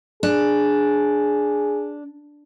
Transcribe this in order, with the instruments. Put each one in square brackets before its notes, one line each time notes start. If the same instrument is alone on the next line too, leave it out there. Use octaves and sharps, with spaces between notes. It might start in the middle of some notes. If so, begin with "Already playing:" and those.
[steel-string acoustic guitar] D4 [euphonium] G#4